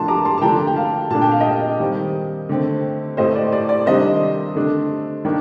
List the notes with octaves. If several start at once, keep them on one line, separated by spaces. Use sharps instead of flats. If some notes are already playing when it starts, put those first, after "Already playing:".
Already playing: A2 F3 A3 D4 A5 C6
A#5 D6
A5 C6
A5
D3 F3 A3 D4 G5 A#5
G5
F5 A5
A#2 A3 D4 A5
G5
F5
D#5 G5
D#3 G3 C4
D3 A3 C4
A2 A3 C4 C5 D#5
D5
D5
D5
C3 D#3 G3 D4 C5 D#5
D3 A3 D4
D#3 A#3 D4